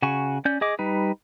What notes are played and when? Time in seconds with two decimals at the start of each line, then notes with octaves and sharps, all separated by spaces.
0.02 C#3 F#4 G#5 C#6
0.45 C#4 D5 G6
0.61 G#4 D#5 D6
0.79 G3 D#4 B4